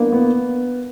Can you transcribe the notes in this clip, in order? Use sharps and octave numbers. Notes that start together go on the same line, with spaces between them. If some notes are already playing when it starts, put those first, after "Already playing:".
Already playing: A#3 B3 D4
B3